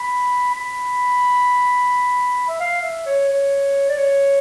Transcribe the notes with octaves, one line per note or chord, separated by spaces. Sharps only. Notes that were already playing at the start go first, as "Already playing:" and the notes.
Already playing: B5
B5
E5
F5
E5
C#5
C#5
D5
C#5